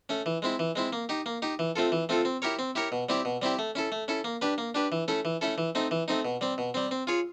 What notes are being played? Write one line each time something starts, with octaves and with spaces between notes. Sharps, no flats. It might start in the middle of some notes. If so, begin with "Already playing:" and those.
A3 C#4
E3
G#3 C4 E4
E3
G#3 C4 E4
A#3
D#4 G4
A#3
D#4 G4
E3
A3 C4 F4 A4
E3
A3 C4 F4 A4
C4
E4 G4 A#4 C#5
C4
E4 G4 A#4 C#5
B2
G3 C4 E4 G4
B2
G3 C4 E4 G4
A3
C#4 E4 A4
A3
C#4 E4 A4
A#3
D4 G4 B4
A#3
D4 G4 B4
E3
A3 C#4 E4 A4
E3
A3 C#4 E4 A4
E3
A3 C4 D#4
E3
A3 C4 D#4
B2
G3 C4
B2
G3 C4
C4
F4 G#4 C#5